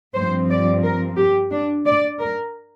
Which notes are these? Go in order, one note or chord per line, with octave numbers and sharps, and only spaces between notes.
G2 F3 C4 C5
D5
A#4
G4
D4
D5
A#4